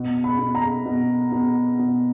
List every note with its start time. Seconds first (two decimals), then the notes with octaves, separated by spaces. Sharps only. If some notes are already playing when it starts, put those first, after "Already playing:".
Already playing: B2
0.24 B5
0.39 B2
0.55 A#5
0.86 B2
1.32 B2
1.79 B2